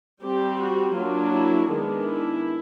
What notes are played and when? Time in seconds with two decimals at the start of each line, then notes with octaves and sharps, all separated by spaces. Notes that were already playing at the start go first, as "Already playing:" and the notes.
0.23 G3 C4 G4
0.60 F#4
0.96 F#3 A#3 D4 F4
1.32 E4
1.69 D#3 G#3 B3 D4
2.05 E4